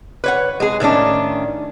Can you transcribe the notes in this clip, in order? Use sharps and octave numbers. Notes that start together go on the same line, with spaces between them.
B4 C#5 F#5
G#3 G#4
A2 D#3 C#4 D4